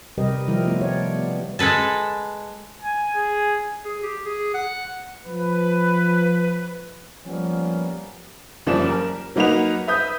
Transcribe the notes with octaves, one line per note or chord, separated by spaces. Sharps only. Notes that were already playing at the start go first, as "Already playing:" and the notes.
C3 G3 G4 A#4 B4 D#5
D#3 F3 G3 E4 G4 A#4
G3 A3 B3 E4
G4 C#5 D5
B3
G#3 A4 B4 A5
G#5
G#4
G#4
G4
G#4
F#5
F3 B4
F3 G3 A#3 B3 C#4
F#1 E3 F3 G3 D5 E7
A#4
F#3 A#3 D#4 B4 F#5 F7
B4 E5 D#6 G6